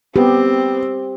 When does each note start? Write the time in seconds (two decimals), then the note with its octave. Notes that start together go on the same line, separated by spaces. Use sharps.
0.16 B3 C4 G4